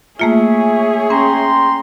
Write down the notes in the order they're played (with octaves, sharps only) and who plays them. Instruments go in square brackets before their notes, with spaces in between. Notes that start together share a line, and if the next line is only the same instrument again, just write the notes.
[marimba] A3 A#3 F4 [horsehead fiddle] G#4 C#5 [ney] E5
[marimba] C#4 [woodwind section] G5 A#5 C6